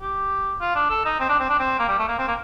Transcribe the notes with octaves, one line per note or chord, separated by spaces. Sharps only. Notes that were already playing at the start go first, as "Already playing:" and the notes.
G4
F4
D4
A4
D#4
C4
D4
C4
D4
C4
A#3
G3
A3
A#3
C4
A#3